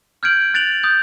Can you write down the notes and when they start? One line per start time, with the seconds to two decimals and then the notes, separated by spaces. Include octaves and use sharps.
0.23 F6 G6 G#6 D7 F#7
0.54 F#6 A6 D7 F7 F#7
0.83 D#6 G6